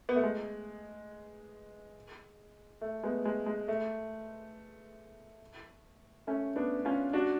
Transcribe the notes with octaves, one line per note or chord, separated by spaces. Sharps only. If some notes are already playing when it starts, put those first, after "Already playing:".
B3
A3
G#3
A3
G#3 B3
G#3
G#3
A3
A3 C#4
B3 D4
C#4 F4
D4 F#4